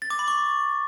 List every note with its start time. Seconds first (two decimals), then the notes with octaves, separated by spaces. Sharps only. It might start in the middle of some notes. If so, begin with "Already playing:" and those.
0.02 A6
0.10 D6
0.19 B5
0.28 C#6